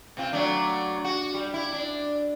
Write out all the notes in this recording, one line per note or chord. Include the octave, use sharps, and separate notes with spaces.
C3 C4 F4
F#3 A3 D4
F#4
G3
E4
D4